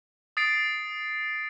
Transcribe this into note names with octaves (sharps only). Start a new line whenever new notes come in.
D#6 A6 C7 D7